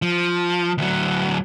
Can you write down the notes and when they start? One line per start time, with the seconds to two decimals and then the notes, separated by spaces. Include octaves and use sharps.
0.02 F3
0.78 D2 F#3